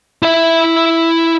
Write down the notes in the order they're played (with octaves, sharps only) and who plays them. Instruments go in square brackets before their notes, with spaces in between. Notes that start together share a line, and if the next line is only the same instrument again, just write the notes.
[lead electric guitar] E4 E5